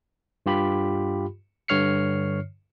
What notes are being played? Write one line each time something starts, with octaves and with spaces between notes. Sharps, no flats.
G2 F4 G4 B5
G2 D3 C#5 F6 C7 C#7